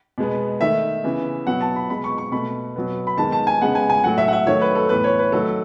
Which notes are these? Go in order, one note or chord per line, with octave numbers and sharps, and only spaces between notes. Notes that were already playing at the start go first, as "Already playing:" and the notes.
B2 G#3 B3
D#3 A3 E5
C#3 E3 B3
B2 F#3 B3 F#5
A5
B5
B2 G#3 B3 B5
C#6
C#6
B2 A3 B5
B2 F#3 B3
B5
D#3 G#3 B3 A5
A5
G#5
C#3 G#3 B3 F#5
G#5
G#5
A2 F#3 A3 F#5
E5
F#5
E5
D#3 F#3 A3 C#5
B4
A4
A2 E3 B3 B4
C#5
B4
D#3 F#3 A3 A4